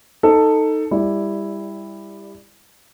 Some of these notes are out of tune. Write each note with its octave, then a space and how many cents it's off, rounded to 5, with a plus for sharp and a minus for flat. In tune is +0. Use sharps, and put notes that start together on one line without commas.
D#4 +0 A4 +10
G3 +25 E4 +0 D5 +5